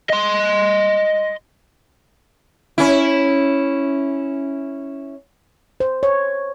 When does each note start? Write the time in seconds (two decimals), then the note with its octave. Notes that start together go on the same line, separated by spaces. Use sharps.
0.10 D#5 C6
2.78 C#4 E4
5.80 C5
6.03 C#5